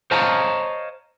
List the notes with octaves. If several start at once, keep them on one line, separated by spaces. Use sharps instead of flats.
C5 C#5 D#5 F5 A5 A#5